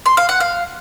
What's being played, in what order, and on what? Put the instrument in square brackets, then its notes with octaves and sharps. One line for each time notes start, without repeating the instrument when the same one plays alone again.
[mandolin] C6
F5
F#5
F5